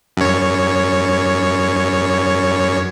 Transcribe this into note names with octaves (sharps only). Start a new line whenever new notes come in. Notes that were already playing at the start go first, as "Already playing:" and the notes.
F#2 C#5